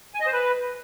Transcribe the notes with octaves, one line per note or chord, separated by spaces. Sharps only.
G#5
D#5
C5
B4